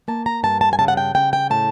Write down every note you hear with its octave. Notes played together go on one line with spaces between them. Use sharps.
A#3 A5
A#5
G2 A5
A5
G#5
C#3 A5
F#5
G5
C#3 G5
G5
A2 A5